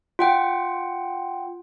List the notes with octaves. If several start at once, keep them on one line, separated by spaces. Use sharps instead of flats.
F4 F#5 G5